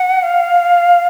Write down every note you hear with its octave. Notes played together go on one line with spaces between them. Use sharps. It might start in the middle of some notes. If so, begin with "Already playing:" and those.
Already playing: F#5
F5